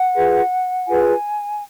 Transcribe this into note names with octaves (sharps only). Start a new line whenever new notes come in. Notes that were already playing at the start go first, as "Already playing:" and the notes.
Already playing: F#5
F4 G#4 B4
F4 G#4 B4 G#5